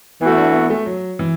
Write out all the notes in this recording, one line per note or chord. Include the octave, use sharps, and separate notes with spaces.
E3 A3 B3 F#4
D4
B3
A3
F#3
E3